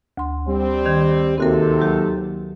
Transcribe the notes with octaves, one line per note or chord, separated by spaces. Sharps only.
D2 C6
G3 C4
D#3 G#6
D#2 C3 C4 F#4 A4 A#4
F#3 G4